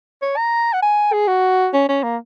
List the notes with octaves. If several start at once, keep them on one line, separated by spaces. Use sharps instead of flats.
C#5
A#5
F#5
G#5
G#4
F#4
C#4
C#4
A#3